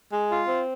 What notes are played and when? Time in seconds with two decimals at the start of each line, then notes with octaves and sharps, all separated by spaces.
0.12 G#3
0.30 F4
0.48 C4